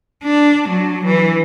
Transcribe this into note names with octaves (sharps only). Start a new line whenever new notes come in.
D4
F#3
E3